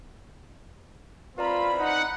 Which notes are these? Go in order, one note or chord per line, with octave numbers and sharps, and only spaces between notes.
C4 E4 F4 B4 D5 A#5 B5
D#4 F#5